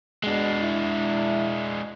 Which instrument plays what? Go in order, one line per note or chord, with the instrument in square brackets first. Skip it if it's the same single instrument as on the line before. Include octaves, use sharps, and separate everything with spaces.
[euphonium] B2 [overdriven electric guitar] G#3 D4
[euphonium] E4